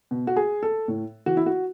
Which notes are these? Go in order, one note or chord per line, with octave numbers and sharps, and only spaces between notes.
B2
F#4
G#4
A4
A2
E3 F#4
E4
F#4